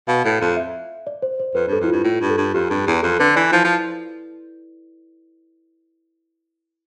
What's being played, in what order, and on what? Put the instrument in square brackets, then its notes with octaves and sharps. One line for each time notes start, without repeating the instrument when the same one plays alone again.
[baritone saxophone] B2 [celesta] F5
[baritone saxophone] A2
F2
[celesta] E5
D5
C5
C5
[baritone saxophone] F2 [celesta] B4
[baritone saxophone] G2 [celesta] A4
[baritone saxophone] F2 [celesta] E4
[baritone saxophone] G2 [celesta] F4
[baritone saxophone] A2 [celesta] F4
[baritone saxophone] G2
[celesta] A4
[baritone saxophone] G2
[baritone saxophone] F2 [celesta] G4
[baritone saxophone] G2
E2
[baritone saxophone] F2 [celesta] A4
[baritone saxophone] D3 [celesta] B4
[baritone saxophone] E3 [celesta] D5
[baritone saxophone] F3 [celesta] E4
[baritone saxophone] F3